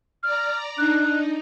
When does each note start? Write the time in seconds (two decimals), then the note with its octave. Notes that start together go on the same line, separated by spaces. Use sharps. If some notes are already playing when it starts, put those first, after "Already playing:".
0.23 D5 A#5 F6
0.78 D4 D#4 F#6